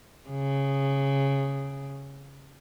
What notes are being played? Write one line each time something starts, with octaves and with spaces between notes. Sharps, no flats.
C#3